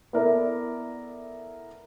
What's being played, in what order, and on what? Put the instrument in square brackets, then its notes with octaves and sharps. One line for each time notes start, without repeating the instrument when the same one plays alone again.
[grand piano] B3 E4 A4 A#4 D5 E5